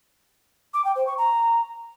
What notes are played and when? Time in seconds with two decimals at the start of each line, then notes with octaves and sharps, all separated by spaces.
0.74 D6
0.85 G5
0.96 C5
1.07 C#6
1.18 A#5